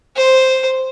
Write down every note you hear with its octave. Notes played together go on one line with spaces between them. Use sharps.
C5